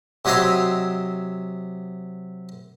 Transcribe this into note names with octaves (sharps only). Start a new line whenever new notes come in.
C3 F#3 C#5 D#5 E5 C6